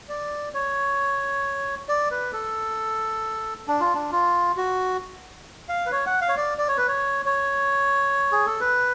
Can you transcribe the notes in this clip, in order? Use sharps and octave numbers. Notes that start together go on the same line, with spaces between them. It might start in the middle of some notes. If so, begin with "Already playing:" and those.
D5
C#5
D5
B4
A4
D4
F4
D4
F4
F#4
F5
B4
C#5
F#5
F5
C#5
D5
D5
C#5
B4
C#5
C#5
G#4
A4
B4